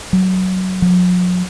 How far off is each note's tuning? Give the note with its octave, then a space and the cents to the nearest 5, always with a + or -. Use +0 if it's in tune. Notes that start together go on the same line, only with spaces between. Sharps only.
F#3 +15
F#3 -45